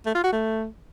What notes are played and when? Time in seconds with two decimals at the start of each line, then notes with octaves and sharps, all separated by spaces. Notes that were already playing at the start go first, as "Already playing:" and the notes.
0.06 A3
0.15 F4
0.24 F#4
0.33 A3